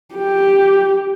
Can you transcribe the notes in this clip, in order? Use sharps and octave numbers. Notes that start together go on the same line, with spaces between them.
G4